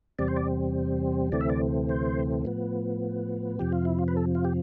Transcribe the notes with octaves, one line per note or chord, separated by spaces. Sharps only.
E2 C3 G3 C4 D5
C5
D5
D2 C3 E3 A3 C4 D5
E5
D5
C5
A2 F3 B3
F2 C3 F3 G4
F4
E4
F4
B4
A4
F4
G4